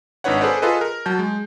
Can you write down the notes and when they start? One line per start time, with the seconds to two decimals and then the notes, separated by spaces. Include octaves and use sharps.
0.24 G#1 D4 D#4 B4 C#5 F#5
0.41 G#4 A4 B4 C5 D5
0.62 F4 G#4 A4 B4 D#5
0.81 A#4
1.06 F#3 A5 G6
1.19 G#3